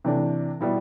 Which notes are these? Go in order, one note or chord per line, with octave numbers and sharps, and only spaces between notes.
C3 E3 A3 D4
B2 G3 B3 E4